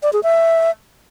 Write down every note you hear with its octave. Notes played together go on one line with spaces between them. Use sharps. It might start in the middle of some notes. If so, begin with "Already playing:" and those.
D5
G#4
E5